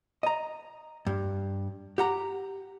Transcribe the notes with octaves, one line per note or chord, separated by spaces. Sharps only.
D#5 A#5
G2
G4 F#5 A#5